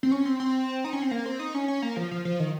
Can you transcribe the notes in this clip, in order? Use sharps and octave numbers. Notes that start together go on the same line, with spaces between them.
C4
C#4
C4
C4
D#4
C#4
C4
A#3
C4
D#4
C#4
C#4
A#3
F3
F3
F3
D#3